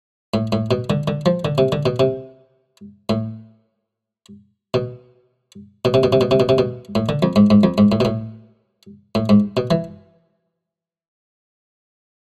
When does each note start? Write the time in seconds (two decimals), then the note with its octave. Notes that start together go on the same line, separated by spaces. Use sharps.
0.34 A2
0.52 A2
0.71 B2
0.90 D3
1.08 D3
1.26 F3
1.45 D3
1.58 C3
1.72 D3
1.86 B2
2.00 C3
3.10 A2
4.74 B2
5.85 B2
5.94 C3
6.03 B2
6.13 C3
6.21 B2
6.31 C3
6.40 B2
6.49 C3
6.58 B2
6.95 A2
7.09 D3
7.23 F2
7.36 G#2
7.50 G#2
7.63 F2
7.78 G#2
7.92 A2
8.00 B2
8.05 A2
9.15 A2
9.29 G#2
9.57 B2
9.71 E3